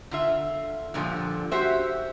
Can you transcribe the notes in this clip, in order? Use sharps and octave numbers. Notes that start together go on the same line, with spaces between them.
D3 F4 E5
G2 A#2 D3 F3
F#4 G4 C5 E5